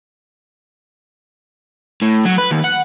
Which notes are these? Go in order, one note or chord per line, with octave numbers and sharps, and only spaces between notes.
A2
F#3
B4
D#2
F#5